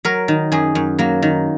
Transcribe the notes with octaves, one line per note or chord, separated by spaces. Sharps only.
F#3 A#4
D#3
F#2 G#4
F#2
F#3 A#3
D#3